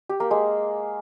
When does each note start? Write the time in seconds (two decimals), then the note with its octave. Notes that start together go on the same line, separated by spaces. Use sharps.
0.09 G4
0.20 A#3
0.31 G#3